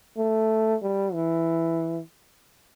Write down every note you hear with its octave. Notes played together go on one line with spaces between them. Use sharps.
A3
G3
E3